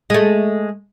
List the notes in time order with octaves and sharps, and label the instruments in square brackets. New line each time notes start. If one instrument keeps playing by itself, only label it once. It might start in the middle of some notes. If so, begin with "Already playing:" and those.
[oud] G#3 A3